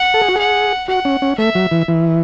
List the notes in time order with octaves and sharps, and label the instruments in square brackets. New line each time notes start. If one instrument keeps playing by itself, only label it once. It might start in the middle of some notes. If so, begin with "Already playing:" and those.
Already playing: [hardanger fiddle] F#5
[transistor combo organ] A4
G#4
F#4
[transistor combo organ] G#4 [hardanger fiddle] F#5
[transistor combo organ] F#4 [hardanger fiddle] F#5
[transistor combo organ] C#4
C#4
[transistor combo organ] A3 [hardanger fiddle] E5
[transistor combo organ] F#3
E3
E3